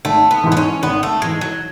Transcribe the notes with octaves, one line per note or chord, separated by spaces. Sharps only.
G#1 A3
B3
G#2 E3
B3
C#4
G#1 B3
A3
G#2 E3 G#3
F#3